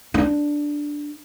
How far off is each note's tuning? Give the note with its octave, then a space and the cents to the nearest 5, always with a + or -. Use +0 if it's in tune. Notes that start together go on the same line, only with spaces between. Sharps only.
D4 +0